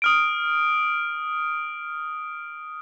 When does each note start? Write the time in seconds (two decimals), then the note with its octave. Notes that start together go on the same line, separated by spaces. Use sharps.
0.02 D#6 F6 D7